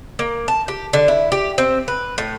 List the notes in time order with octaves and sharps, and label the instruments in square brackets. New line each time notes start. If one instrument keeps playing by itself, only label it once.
[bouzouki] A#3
A5
G4
D3
E4
G4
C4
B4
A2